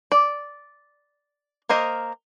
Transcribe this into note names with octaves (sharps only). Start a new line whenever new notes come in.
D5
A#3 A#4 C5 D#5